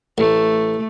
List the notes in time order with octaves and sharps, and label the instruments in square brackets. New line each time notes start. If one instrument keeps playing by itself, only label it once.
[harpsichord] A1 [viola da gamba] A3